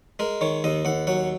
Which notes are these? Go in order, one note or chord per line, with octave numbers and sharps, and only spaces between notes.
G#3 A#4
D#3 C#5
D#2 D#5
D#2 F#5
F#3 F#5